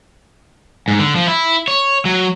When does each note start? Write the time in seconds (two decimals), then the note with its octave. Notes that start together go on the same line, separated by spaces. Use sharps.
0.88 G#2
0.99 D3
1.16 F3
1.27 E4
1.68 C#5
2.05 F#3